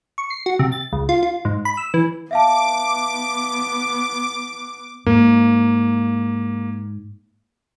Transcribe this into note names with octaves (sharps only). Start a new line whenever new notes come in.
C#6
C7
F#4
C3
A6
C#2
F4
F4
G#2
B5
E6
E3
B3 E5 F5 A5 D6
G#2 A#3